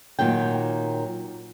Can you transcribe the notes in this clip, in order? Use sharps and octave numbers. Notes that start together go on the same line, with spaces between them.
A#2 D#3 F#3 G5